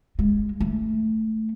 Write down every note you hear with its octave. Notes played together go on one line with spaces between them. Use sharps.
G#3
A3